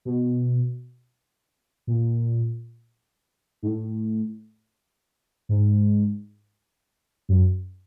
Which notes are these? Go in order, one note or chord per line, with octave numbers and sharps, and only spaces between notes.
B2
A#2
G#2
A2
G#2
F#2